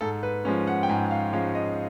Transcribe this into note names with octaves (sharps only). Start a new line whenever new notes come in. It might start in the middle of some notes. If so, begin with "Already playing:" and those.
G#2 A4
B4
F3 G#3 C#4
F#5
G5
G#2 G#5
F5
F3 G#3 C#4 F5
D#5